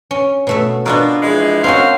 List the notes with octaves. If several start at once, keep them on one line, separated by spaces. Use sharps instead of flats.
C#4
B2 A3 E5
B2 D4 F4 A#4
E3 F3 G#3
C4 C#4 F#4 A#4 C5 F5